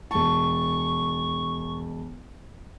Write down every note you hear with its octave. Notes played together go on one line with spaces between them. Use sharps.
E1 A5 C#6